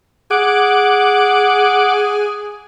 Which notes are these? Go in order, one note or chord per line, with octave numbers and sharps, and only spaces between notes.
G#4 F#5 D6